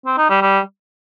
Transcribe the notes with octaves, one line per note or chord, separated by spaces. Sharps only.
C4
D#4
G3
G3